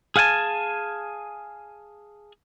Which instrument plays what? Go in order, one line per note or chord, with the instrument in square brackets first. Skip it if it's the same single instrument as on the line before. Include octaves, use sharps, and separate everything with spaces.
[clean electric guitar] G#4 F5 F#5 G#5 A5